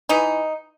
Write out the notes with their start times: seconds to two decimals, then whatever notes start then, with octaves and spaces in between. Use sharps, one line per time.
0.09 E3 D#4